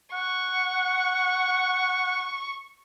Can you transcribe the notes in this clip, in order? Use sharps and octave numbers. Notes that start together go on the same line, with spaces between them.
F#5 C#6